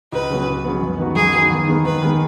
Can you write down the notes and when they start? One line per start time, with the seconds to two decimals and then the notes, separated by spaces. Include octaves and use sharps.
0.12 C#2 B4
0.30 C#3 F#3 B3
0.47 C#2
0.64 C#3 F#3 B3
0.81 F#2
0.98 D#3 B3 F#4
1.15 F#2 G#4
1.33 D#3 B3 F#4
1.50 D#2
1.67 D#3 G#3 B3
1.84 D#2 B4
2.02 D#3 G#3 B3